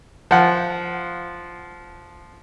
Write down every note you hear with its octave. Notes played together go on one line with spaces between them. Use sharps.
F3 F#5